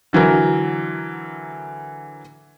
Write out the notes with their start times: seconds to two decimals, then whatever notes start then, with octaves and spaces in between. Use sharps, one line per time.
0.13 D3 E3 F#3 A#4